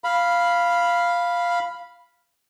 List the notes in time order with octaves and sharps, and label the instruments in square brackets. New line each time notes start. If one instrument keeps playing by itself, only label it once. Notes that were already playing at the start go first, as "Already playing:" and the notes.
[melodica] F5 B5